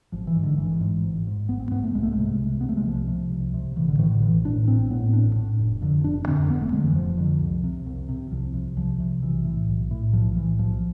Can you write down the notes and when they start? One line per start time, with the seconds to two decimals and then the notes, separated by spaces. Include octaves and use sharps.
0.12 G#1 F3
0.27 E3
0.35 G#2
0.43 D3
0.58 G#1 E3
0.81 G#2
1.04 G#1
1.27 G#2
1.49 G#1 B3
1.60 C4
1.72 G#2 B3
1.83 A3
1.94 C2 G#3
2.03 A3
2.12 G#3
2.18 C3
2.40 C2
2.61 C3 B3
2.69 A3
2.77 G#3
2.85 C2 F3
3.08 C3
3.31 C2
3.54 C3
3.76 A1 E3
3.88 D3
3.99 A2 E3
4.11 D3
4.22 A1 E3
4.45 A2 D4
4.67 A1 C4
4.90 A2 B3
5.13 A1 D4
5.36 A2
5.59 F1
5.82 F2 D3
6.04 F1 D4
6.27 F2 D3 C4
6.50 F1 B3
6.61 A3
6.73 F2 D3 G#3
6.84 E3
6.95 F1 F3
7.18 F2 D3
7.41 C2
7.64 C3
7.86 C2
8.09 C3
8.31 C2 F3
8.54 C3
8.77 C2 F3
9.00 C3
9.22 B1 E3
9.45 A2
9.68 B1
9.91 A2
10.13 B1 F3
10.36 A2 E3
10.59 B1 F3